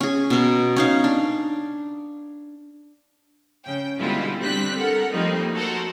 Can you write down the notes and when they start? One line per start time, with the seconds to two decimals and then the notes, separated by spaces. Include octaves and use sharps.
0.01 C#4 G#4
0.30 B2 A#4
0.76 C#4 D#4 F5
1.04 D4
3.65 C#3 G5
3.99 B2 D3 G3 G#3 E4 F4
4.42 G3 C4 D4 G4 F#6 B6
4.77 A4 A#4 F#5
5.12 F3 G3 A3 A#3 C4 D#4
5.54 F#4 A4 A#4 C5 F#5